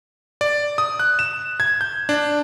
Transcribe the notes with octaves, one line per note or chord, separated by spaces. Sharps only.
D5
D#6
F#6
E7
G#6
G6
D4